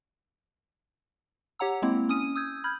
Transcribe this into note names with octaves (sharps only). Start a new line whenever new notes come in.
G4 C#5 F#5 A#5 E6
G#3 A#3 C4 E4
C#4 D#6 D#7
D#6 E6 G6 G#6
B5 F6 G6 G#6